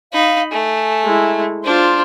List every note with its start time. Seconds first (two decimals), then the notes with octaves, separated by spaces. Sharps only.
0.13 D#4 F5 B5
0.52 A3 G#5
1.04 G#3 E4
1.64 D4 F4 C5